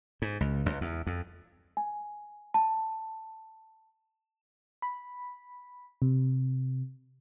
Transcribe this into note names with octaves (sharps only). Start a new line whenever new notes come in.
G#2
C#2
C#2
E2
F2
G#5
A5
B5
C3